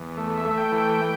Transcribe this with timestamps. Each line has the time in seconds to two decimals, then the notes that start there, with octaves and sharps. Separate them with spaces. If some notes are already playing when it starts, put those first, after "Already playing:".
Already playing: E2
0.17 A3
0.38 E5
0.45 A3
0.51 E5
0.58 G5
0.72 E3
0.78 G5